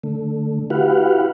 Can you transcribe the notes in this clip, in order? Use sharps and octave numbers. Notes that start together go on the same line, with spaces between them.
D3 A3
E4 F#4 G4 B4 F5 F#5